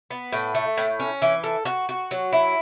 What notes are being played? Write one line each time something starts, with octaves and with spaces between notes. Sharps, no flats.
B3
A2
A3
A2
C#4
E3
A4
F#4
F#4
F#3
E4